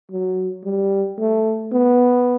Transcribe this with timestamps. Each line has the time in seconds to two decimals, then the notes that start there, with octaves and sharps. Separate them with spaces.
0.11 F#3
0.65 G3
1.19 A3
1.73 B3